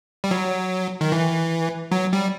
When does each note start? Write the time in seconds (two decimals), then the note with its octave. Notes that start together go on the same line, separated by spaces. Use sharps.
0.24 G3
0.31 F#3
1.01 D#3
1.12 E3
1.92 F#3
2.13 G3